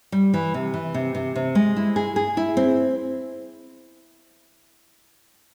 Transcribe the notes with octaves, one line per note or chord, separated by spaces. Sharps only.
G3
E3
C3
E3
C3
C3
C3
G#3
E4
G#4
G#4
E4
C4